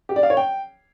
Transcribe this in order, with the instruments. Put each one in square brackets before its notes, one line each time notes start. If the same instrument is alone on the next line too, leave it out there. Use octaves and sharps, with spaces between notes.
[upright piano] G4
D5
F5
C#5
G5